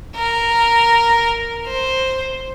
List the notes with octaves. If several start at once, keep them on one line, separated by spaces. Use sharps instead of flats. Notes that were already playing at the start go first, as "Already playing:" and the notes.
A#4
C5